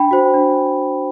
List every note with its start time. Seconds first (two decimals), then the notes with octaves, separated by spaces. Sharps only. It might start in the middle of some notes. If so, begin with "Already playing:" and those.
Already playing: D4 G5 B5
0.11 F#4 C5
0.34 D4